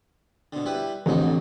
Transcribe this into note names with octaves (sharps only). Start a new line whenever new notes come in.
B2 D3
G3 E4 B4
A1 F2 D3 D#4